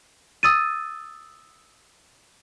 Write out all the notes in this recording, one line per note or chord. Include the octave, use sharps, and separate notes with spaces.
D#6 E6 A6 D#7